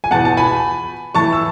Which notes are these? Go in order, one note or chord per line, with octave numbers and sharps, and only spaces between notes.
G#5
E2 B2 F#5 A5
A5
G#5 B5
A2 E3 A5 C#6
E6